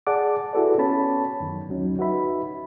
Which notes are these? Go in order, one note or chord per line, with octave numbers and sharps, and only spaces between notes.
G#4 D5 F#5 A5 D6
E4 F#4 G#4 A4 B4 D5
B3 C#4 C#5 A5 B5
F#2 D#3
D2 F#3 C#4 D#4
D#4 F#4 B4 E5 B5